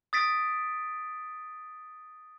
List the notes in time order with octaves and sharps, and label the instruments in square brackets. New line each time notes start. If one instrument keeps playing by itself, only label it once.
[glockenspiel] D#6 A6 B6 D7